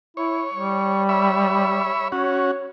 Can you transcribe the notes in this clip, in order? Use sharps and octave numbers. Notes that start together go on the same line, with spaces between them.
E4 C#5
G3
C#5 E5 B5
C#4 F#4 C#5